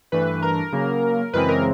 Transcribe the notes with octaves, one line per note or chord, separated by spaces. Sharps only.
G2 E3 A3 D4 B4
A#4
C#3 F#3 A#3
F#2 C#3 E3 G#3 C4 B4
A#4